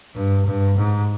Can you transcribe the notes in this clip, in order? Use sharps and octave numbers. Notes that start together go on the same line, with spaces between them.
G2
G2
G#2